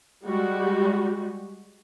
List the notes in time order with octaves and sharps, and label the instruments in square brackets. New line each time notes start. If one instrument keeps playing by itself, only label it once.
[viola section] G3 G#3 F#4 G4